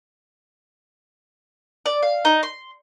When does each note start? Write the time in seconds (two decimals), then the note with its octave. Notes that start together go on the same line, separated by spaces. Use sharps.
1.86 D5
2.02 F5
2.25 D#4
2.43 C6